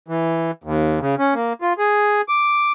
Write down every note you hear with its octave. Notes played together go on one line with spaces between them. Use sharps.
E3
D#2
C#3
C#4
A#3
F4
G#4
D6